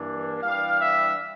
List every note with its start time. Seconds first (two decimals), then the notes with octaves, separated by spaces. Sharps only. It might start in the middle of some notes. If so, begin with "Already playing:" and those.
Already playing: G2 E3 A#3 D4
0.42 E3 G3 D4 F5
0.78 E5